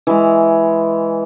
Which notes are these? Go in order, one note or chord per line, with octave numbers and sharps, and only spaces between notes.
E3 G#3